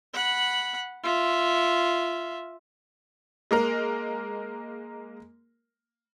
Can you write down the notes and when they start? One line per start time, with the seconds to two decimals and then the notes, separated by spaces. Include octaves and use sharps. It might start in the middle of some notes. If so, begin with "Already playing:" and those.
0.14 F#5 B5
1.04 F4 E5
3.51 G#3 A#3 A#4